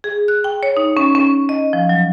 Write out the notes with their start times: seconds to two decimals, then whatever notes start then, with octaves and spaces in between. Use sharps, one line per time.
0.04 G#4
0.28 F#6
0.44 G5
0.63 C#5
0.77 D#4
0.97 C#4
1.15 C#4
1.49 D#5
1.73 F3
1.89 F#3